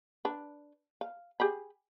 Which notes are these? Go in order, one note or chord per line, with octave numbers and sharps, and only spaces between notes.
D4 B4
F5
G4 G#4 B5